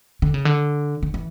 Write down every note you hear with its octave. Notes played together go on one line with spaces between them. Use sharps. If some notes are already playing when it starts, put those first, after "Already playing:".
D3
C#3
D3
D3
E3